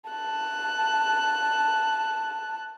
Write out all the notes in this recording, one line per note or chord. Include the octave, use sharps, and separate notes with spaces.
A5 F#6